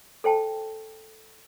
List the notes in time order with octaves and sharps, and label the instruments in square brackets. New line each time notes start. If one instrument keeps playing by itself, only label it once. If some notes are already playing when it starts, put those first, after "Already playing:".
[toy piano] A4 C5 G5 A5